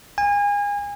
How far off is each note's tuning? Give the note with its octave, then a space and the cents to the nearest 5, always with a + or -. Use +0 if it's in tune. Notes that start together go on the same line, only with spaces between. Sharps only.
G#5 -30